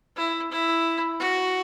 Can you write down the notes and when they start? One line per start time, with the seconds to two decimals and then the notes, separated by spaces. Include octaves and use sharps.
0.17 E4
0.51 E4
1.20 F#4